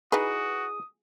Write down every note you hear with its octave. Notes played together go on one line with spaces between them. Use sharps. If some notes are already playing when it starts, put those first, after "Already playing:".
E3 D#4 F#4 G#4 B4 D#6